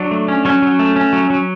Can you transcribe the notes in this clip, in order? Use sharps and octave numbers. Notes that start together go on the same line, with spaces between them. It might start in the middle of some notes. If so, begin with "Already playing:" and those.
Already playing: F#3 D4
A3
C#4
F#3 C#4
F#3
A3
C#4
F#3
F#3